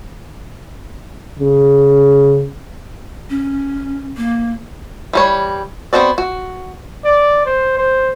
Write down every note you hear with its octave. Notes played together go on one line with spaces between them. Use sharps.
C#3
C#4
A#3
E3 G3 C#5
B3 C4 F#4 A4 D5
F#4
D5
C5
C5